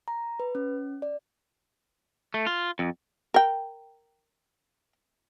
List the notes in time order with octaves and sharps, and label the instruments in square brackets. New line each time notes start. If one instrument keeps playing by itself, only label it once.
[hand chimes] A#5
B4
C#4
D5
[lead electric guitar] A3
F4
F2
[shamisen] A#4 G5